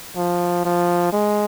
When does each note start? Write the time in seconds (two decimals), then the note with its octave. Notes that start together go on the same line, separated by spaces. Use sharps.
0.16 F3
0.65 F3
1.13 G#3